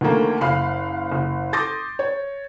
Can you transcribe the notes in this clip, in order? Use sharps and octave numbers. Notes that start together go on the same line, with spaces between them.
D2 D3 D#3 F3 A3 A#3
F#1 F5 B5 C7
F#1
C6 D6 D#6 G6 A6 A#6
C#5